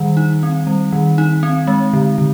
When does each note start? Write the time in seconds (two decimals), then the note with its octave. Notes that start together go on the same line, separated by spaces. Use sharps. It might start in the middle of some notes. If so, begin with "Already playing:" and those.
Already playing: D#3 G3
0.17 D#4
0.43 C4
0.67 G3
0.92 D#3
1.18 D#4
1.43 C4
1.67 G#3
1.93 D3
2.18 D3